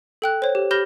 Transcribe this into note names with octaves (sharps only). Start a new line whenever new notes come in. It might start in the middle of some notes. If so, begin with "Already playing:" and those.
A4 G5 F#6
C5 C#5
G4
G4 B5 F6 G6 A#6 G7